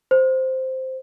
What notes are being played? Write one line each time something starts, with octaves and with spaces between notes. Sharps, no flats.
C5